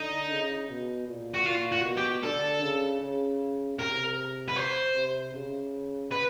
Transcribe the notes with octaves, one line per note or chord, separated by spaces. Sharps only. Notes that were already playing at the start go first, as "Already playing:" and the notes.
Already playing: D3 D#4
C#3
B2
A#2
F#4
A#2 F4
F#4
B2
G4
D3 A4
C#3
C#3
C3 A#4
B4
C5
C3
C#3
B4